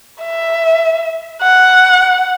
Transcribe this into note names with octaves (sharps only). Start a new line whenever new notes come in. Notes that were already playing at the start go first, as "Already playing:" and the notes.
E5
F#5